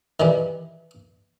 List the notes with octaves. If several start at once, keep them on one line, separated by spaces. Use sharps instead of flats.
D#3 E3 G3